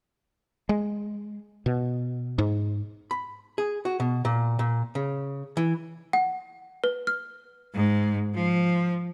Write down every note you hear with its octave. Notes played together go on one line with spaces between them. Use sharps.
G#3
B2
G#2
B5
G#4
F#4
B2
A#2
A#2
C#3
E3
F#5
B4
F6
G#2
F3